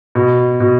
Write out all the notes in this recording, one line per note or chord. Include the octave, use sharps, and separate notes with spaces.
B2
B2